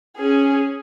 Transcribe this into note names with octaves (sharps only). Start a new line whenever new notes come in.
C#4 G#4